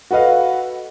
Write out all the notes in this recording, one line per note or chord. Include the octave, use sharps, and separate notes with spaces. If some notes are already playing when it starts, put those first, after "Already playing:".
F#4 A4 B4 D#5 F5